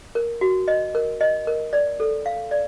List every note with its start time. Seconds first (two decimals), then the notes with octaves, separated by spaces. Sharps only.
0.15 A#4
0.41 F#4
0.68 D#5
0.95 A#4
1.21 D#5
1.47 A#4
1.73 D5
2.00 A4
2.26 F5
2.51 D5